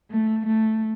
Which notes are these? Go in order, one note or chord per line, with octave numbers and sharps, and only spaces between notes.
A3
A3